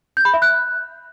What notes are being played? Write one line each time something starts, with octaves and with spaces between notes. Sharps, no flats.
G6
B5
E5
F#6